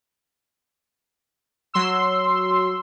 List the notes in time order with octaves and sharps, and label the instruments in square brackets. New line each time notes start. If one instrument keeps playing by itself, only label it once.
[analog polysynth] F#3 C6 E6